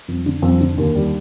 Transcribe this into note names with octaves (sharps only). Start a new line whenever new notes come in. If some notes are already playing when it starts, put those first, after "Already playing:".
F2
D3
F2
D3
D#2
G3